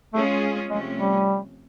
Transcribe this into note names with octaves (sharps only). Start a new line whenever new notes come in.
G#3 A3 C#4 F4 G#4
C3 F3 G#3 A3 C#4
G3